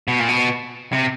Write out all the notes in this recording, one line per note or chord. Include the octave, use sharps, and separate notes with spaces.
B2
A#2
B2
C3